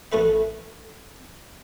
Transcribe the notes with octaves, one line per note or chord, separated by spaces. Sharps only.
A1 A3 A4 B4 E5